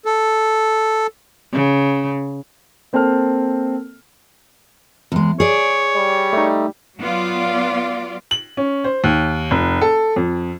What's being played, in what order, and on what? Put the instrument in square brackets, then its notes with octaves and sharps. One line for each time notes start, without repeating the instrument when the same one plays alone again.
[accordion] A4
[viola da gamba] C#3
[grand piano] A#3 C4 A4 C5 A5 F6
[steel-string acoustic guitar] E2 G#3
[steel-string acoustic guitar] G#4 D5 [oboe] C#5
[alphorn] G3
[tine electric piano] A3 D#4
[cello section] F#3 B3 F4 D5
[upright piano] F#7
C#4
C5
D#2
F1
A4
F2